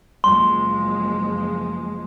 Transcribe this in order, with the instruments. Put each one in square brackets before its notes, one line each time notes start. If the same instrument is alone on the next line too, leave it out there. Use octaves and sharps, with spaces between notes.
[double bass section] F#1 F3 G#3 [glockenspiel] C6